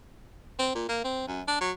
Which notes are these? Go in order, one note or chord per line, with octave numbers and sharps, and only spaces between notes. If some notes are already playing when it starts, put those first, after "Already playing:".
C4
A#2
A#3
C4
F#2
D4
F#3